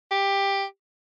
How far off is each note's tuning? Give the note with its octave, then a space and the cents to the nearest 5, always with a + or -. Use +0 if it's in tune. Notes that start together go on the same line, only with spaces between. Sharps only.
G4 +10